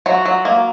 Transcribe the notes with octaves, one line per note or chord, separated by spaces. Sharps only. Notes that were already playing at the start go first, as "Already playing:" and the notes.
F#3 F#4
F#3
A#3